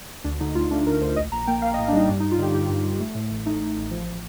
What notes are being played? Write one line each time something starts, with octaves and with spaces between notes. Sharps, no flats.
D2 D4
D3 D#4
D2 F4
A3 D4
D2 A#4
D2 C5
A#1 D#5
A#1 A#5
A#3 G5
A#3 F5
D#5
A2
D4
G3 D#4
G2 D4
D#4
G2
F4
D3 G4
G2 G4
G2
G2
A3
A2
A1
A3 D#4
A3
A1
F3